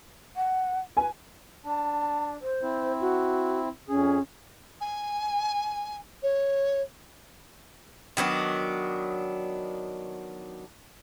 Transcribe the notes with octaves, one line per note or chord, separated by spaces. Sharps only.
F#5
B4 G#5
D4 A5
C5
C4 E4
F#4
F2 C#4 G#4
G#5
C#5
D#3 F#3 B3 D4